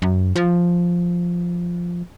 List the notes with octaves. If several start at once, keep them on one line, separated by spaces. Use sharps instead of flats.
F#2
F3